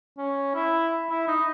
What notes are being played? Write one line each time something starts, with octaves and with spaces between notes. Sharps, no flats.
C#4
E4
E4
D#4